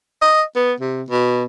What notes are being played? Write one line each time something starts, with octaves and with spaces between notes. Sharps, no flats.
D#5
B3
C3
B2